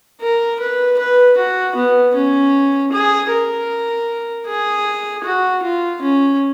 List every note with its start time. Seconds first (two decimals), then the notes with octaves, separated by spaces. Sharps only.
0.21 A#4
0.60 B4
0.99 B4
1.37 F#4
1.76 B3
2.15 C#4
2.92 G#4
3.31 A#4
4.47 G#4
5.24 F#4
5.63 F4
6.02 C#4